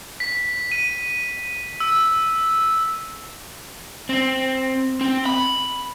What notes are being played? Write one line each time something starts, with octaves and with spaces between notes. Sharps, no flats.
B6
D#7
E6
C4
C4
B5